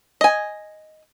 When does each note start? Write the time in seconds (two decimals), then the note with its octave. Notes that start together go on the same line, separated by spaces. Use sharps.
0.21 D#5 G#5